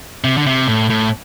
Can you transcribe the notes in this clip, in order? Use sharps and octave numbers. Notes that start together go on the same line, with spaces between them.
C3
D3
C3
A2
A2